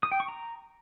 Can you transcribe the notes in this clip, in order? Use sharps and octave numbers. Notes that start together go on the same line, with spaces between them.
D#6
G5
C#6
A#5